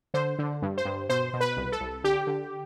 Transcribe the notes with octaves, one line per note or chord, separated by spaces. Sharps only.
D3 C5
D3
G2
C5
G2
B2 C5
B2
B4
C2
A4
C2
D3 G4
D3